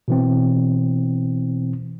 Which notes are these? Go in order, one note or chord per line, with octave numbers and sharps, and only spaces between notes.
B2 E3 C4